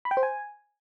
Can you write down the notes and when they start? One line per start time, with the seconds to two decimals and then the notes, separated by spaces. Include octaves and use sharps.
0.05 B5
0.11 G5
0.17 C5
0.23 G#5